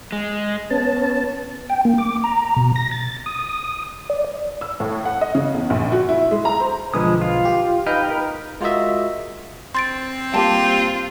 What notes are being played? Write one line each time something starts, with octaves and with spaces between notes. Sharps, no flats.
G#3
B3 C#4 A5
G5
A#3
D6
A#5
B2
A#6
A6
D#6
D5
E6
A2
F#5
D#5
C#3
E2
A#1
F#4
E4
G#3
A#5
C5
B1 D3 F3 G#3 B4 D#6
F4
G4
D#4 B4 D#5 F5 G5
A#4 B4
G#3 F4 F#4 A#4 D#5 E5
C4 C6 A6 D7
G3 A#3 F4 G4 G5 A5